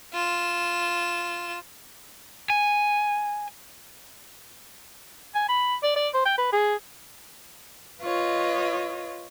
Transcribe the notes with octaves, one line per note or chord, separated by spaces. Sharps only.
F4 E7
G#5
G#5
B5
D5
D5
C5
G5
B4
G#4
F4 B4 C#5 D#5